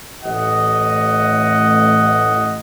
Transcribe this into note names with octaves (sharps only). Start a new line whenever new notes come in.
A1 D#5 F#5